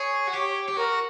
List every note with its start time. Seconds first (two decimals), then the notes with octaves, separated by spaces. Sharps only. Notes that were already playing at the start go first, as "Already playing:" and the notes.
Already playing: G#4 C#5
0.27 F#4
0.33 G4
0.68 G4
0.76 F#4 A#4